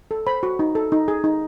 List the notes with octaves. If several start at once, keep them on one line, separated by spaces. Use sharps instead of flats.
A4
C5 B5
F#4
D#4
A4
D#4
G#4
D#4